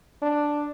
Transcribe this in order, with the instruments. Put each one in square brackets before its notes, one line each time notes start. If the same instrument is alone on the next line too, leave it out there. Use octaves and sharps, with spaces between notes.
[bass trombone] D4